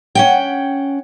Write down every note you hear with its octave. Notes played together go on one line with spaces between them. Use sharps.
C#4 F#5 G5